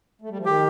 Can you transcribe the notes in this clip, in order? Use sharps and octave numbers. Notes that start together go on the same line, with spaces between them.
A3
G3
F3
D#3 G4